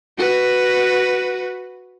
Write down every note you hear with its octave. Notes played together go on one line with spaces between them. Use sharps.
F#4 B4